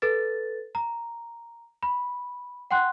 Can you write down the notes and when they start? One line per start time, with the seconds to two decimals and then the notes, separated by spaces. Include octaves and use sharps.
0.02 A4 B4 A6
0.75 A#5
1.83 B5
2.71 F#5 G5 C6 F#6